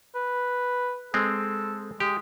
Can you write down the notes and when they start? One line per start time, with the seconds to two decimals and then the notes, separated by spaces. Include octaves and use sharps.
0.15 B4
1.14 G#3 C4 A4
2.00 G#3 G4